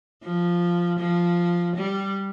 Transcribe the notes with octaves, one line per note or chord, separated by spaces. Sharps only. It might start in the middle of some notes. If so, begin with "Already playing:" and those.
F3
F3
G3